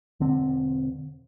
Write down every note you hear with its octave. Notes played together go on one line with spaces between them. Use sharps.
E1 D3 C4